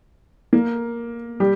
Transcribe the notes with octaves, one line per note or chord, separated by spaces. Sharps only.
A#3 A#4
G3 G4